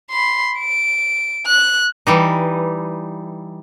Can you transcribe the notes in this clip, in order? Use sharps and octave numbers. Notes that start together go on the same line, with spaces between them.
B5 C6
D7
F#6
E3 G3 D#4